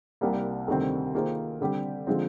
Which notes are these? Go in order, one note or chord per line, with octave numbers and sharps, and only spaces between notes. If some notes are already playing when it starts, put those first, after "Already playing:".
C2 C3 G3 A#3
D2 C3 D#3 G3 C4
D#3 A#3 F4 G#4 C5
D3 G3 C4 G4
D3 F3 G#3 C4